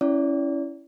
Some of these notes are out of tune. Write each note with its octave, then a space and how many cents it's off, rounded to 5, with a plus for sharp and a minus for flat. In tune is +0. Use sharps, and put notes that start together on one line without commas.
C#4 +0 E4 +0 D5 -35